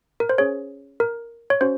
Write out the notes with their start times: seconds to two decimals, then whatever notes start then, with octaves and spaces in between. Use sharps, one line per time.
0.20 A#4
0.29 C5
0.38 C#4 G#4 C#5
1.00 A#4
1.50 C#5
1.61 C#4 F#4 C5